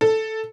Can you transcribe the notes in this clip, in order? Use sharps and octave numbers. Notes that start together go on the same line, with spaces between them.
A4